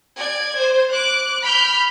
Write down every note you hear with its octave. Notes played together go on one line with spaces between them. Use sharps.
D5 G#6
C5
D6 F#6
B5 F6 G6